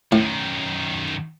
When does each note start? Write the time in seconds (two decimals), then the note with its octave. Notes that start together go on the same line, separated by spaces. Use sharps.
0.12 F#2 A2 D#3